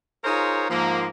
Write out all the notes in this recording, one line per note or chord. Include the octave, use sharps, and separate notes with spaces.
D#4 F4 G#4 A#4 C5 C#5
G#2 F3 A#3